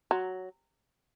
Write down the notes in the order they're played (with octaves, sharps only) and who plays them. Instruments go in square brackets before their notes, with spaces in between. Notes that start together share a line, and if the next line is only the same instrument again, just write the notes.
[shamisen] F#3